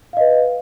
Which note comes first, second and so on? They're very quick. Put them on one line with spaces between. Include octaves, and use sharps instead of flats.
F5 D#5 B4